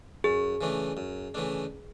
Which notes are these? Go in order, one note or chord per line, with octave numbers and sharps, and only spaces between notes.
F#2 G#4
C#3 E3 A3 D4
F#2
C#3 E3 A3 D4